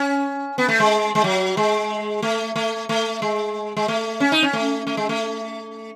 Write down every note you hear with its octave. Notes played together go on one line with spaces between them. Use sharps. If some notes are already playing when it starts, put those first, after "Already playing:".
Already playing: C#4
B3
A3
G#3
G#3
F#3
G#3
A3
A3
A3
G#3
G#3
A3
C#4
D#4
C#4
A3
A3
G#3
A3